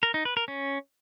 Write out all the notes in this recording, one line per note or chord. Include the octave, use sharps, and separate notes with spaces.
A#4
D#4
B4
A#4
C#4